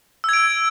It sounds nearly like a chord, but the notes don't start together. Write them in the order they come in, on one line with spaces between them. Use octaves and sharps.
E6 G#6 D7